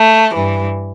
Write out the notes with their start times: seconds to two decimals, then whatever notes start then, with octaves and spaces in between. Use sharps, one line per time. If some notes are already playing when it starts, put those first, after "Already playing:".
Already playing: A3
0.35 G2 E3